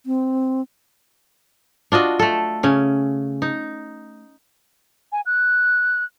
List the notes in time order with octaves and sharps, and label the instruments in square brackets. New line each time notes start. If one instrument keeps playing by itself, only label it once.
[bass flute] C4
[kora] D4 F4 F#4 D#5
A3 A4
C#3 C#4
D#4
[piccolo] G#5
F#6